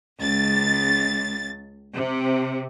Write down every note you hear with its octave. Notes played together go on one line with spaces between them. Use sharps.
C#2 A6
C3